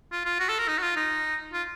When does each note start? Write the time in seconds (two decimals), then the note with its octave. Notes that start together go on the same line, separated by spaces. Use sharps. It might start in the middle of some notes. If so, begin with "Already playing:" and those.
0.12 F4
0.25 F4
0.39 F#4
0.49 A4
0.59 A#4
0.68 D#4
0.78 F#4
0.82 F4
0.96 D#4
1.53 F4